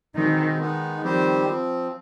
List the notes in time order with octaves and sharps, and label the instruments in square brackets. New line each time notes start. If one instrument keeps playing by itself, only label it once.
[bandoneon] B2 G#3 C4 D#4 [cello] D#3
[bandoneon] D#3 G#3 B3 D#4
[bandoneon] D#3 G3 C4 G4 C5 [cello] F3
[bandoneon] F3 C4